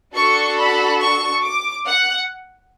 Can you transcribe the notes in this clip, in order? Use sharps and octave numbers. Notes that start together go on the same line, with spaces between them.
D4 F#4 A4 C#6
B5
C#6
D6
F#5